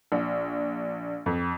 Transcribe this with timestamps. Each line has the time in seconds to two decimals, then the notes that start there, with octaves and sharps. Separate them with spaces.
0.12 A#1
1.26 F2